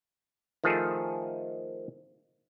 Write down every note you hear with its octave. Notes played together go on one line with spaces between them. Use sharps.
D#3 F3 A3 G#4 A4 C5